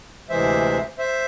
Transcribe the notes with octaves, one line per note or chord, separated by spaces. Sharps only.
D2 C3 E3 G#3 C5 E5
C5 E5